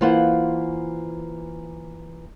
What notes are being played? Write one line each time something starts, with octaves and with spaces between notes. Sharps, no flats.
E3 A#3 F4 C5 F#5